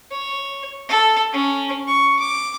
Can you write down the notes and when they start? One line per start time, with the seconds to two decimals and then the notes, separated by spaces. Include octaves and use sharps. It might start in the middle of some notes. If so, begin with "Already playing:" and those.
0.11 C#5
0.89 A4
1.33 C#4
1.88 C#6
2.20 D6